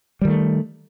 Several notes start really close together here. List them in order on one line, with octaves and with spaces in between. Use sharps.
G3 D#3 A3